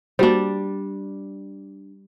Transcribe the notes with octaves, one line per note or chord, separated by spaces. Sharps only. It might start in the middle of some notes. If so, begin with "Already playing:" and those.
G3 A#3 D4 F#4 C5